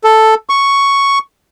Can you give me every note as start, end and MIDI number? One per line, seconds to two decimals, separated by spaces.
0.04 0.34 69
0.49 1.18 85